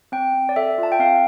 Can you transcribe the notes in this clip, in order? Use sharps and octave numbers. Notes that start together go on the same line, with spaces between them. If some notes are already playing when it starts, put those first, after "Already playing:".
C4 G5
C4
D5
A4 E5
F4
A5
G5
C4 F5